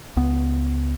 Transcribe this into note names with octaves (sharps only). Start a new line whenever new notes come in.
C#2 B3